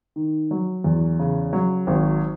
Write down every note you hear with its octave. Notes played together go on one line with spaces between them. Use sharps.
D#3
F#3
E2
C#3
F#3
G#1